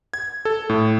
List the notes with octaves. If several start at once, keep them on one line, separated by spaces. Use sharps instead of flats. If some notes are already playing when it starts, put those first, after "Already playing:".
G#6
A4
A2